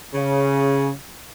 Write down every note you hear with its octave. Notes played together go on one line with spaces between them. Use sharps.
C#3